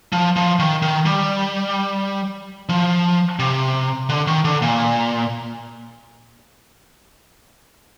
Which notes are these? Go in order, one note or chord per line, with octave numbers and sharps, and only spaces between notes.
F3
F3
D#3
D#3
G3
F3
C3
D3
D#3
D3
A#2